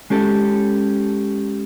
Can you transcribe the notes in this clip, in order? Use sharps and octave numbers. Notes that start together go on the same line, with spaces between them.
G#3 C#4 G4 A4